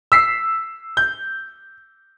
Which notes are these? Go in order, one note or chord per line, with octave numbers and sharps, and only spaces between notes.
E6 B6 C7
G6